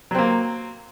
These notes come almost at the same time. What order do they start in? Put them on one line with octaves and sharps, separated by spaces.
F#3 C4 A#3